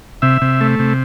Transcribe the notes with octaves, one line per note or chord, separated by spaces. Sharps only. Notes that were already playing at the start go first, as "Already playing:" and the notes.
C3 E5
C3
A3
C3